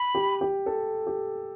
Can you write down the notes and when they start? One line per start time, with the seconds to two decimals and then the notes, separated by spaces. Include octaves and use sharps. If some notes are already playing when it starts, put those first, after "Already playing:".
Already playing: B5
0.15 G4
0.41 G4
0.66 A4
1.07 G4